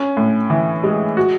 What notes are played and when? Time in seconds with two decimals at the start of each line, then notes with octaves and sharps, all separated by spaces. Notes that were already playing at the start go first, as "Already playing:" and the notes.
Already playing: C#4
0.17 A2
0.50 E3
0.84 G#3
1.17 F#4